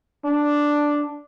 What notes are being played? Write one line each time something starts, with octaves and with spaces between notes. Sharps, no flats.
D4